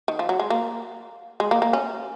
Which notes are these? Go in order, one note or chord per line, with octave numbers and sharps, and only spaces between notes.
D#3
F3
F#3
G#3
A#3
G#3
A#3
A#3
C#4